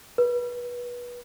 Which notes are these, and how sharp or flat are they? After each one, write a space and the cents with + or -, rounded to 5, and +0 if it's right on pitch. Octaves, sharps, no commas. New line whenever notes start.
B4 -25